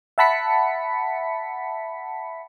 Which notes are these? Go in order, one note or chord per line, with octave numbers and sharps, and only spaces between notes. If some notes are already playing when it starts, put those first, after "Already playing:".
E5 F#5 A5 B5 B6 C#7